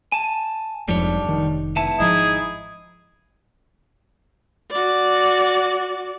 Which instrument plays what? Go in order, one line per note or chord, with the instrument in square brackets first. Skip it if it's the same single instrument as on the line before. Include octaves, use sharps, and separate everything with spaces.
[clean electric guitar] G#5 A5
[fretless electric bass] F1 F2 G#2 [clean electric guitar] G3 C#5 [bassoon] D4
[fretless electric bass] F1 D#3
[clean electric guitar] C#2 B3 A5 [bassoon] E4
[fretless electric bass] G#1 F3 [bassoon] D#4 [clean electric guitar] E4 [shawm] G#4
[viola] F#4 D5